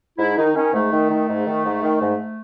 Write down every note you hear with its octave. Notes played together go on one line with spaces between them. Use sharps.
G#2 E4
D#3 D#4
D#3 C#4
G#2 A3
D#3
D#3
G#2
D#3
G#2
D#3
G#2